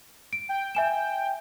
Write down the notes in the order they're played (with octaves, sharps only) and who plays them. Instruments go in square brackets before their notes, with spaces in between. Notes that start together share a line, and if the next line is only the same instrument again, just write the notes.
[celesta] D7
[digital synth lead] G5
[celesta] E5 G#5 E7